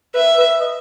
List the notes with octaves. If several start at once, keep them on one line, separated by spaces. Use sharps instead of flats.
B4 E5
B4
D#5